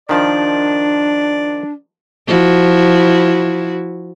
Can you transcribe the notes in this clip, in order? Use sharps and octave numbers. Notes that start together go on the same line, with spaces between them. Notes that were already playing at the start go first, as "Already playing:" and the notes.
D#3 F3 D4 D5
F3 E4 F#4